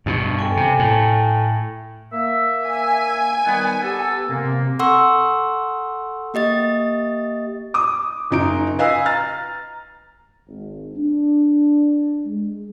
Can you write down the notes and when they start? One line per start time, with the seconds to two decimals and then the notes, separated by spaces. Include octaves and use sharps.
0.06 G2 B2
0.39 A4 G5 G#5
0.57 C3
0.79 A2
2.13 A#3 E5
2.66 G#5
3.45 D#3 G3 B3
3.82 B3 G4 A4
4.29 C3 A#3
4.79 A4 F#5 C6 C#6 E6
6.34 A#3 G4 D#5 A6
7.74 D6 D#6
8.30 F#1 D#4 D7
8.79 B4 D#5 F5 G#5 E6
9.05 A#5 F6 A6
10.48 G#1
10.96 D4
12.25 G#3